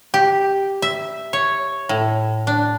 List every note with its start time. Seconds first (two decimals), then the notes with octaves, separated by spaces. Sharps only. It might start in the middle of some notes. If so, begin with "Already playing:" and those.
0.14 G4
0.82 E5
1.33 C#5
1.89 A2
2.47 D4